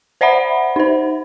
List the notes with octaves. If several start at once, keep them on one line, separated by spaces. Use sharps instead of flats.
C5 D5 E5 F#5 B5
D#4 C5